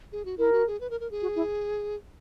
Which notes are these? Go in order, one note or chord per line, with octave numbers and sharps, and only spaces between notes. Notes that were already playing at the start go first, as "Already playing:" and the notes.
G#4
F#4
E4 A#4
F#4
G#4
B4
A#4
A#4
G#4
F#4
E4